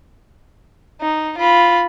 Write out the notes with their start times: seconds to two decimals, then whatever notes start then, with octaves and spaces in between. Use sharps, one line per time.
1.01 D#4
1.37 F4 B5